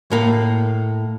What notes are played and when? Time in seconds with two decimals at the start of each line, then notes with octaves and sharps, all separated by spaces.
0.11 A2 A#3